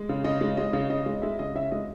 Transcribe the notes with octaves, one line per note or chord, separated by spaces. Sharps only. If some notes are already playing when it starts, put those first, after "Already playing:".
Already playing: G#3
C#3
C#3 D#5
G#3
G#3 D#5
C#3
C#3 D#5
G#3
G#3 E5
C#3 D#5
C#3 E5
G#3 D#5